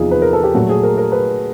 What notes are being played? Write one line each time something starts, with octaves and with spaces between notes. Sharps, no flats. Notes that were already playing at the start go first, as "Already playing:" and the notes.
Already playing: E2 C3 F3 D#4 F4 G#4
B4
A#4
A4
G4
A#2 F#3 A3 F#4
G#4
A#4
A#4
B4